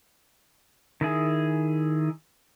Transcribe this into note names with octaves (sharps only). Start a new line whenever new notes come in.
D#3 E4 G#4